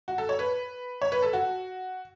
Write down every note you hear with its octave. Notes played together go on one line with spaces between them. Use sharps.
F#4
A4
C#5
B4
C#5
B4
A4
F#4